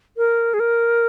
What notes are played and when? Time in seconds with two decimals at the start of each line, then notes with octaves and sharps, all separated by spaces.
0.17 A#4
0.54 G#4
0.60 A#4